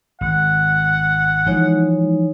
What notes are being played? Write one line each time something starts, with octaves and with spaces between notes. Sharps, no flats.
G#1 F#5
E3 F3 G#3 D#4 C#5